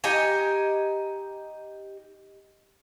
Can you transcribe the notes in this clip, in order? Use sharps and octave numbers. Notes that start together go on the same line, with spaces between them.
D#4 G4 D#5 G#5